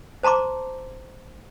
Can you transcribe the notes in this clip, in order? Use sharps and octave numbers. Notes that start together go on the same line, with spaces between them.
C5 A5 A#5 C6 D6